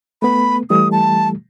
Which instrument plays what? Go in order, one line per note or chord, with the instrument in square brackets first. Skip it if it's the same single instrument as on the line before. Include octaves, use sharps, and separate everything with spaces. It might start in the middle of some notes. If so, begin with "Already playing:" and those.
[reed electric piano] A3 B3 [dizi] B5
[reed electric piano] E3 G3 A3 [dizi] D#6
[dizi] A5